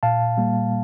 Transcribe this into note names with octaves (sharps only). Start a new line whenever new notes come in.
A#2 F5 A5
G3 A#3